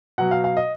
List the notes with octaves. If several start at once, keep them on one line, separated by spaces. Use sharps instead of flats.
B2 F#3 F#5
F5
F5
D#5